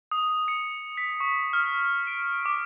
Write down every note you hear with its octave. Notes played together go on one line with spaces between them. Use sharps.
D#6
C#7
B6
C#6
F6
D7
D6